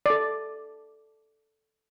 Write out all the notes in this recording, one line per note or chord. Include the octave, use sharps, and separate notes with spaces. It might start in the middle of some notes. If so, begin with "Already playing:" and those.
A4 D5